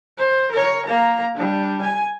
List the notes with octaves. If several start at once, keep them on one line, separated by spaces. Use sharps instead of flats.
C5
A#4 C#5
A#3 A#5
G3 D4
G#5